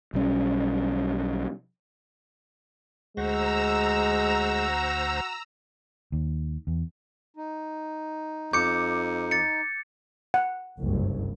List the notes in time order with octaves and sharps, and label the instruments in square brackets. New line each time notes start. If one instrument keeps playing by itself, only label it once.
[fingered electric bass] B1 G3 C#4
[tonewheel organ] D2 C5 A#6 [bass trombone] G#3 [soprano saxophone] F#4 [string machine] A#5 E6
[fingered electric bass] D#2
E2
[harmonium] D#4
[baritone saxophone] F2 [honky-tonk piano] D6 [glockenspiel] G6 C#7
[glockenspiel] A6 C#7
[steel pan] F#5
[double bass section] F#1 C2 G2